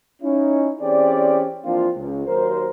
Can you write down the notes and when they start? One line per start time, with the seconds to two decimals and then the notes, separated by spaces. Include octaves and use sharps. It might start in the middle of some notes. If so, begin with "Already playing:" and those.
0.22 C#4 D#4 E4
0.81 E3 C4 C#4 G4 G#4 D5
1.64 E3 F3 A#3 C4 D4 F4
1.96 C#2
2.26 D#2 F#3 A#4 C5